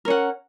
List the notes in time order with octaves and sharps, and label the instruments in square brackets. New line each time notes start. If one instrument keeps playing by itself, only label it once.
[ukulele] A#4
C#4
F#5